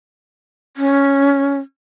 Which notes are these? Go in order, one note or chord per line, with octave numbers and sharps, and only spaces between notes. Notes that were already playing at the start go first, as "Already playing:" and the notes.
C#4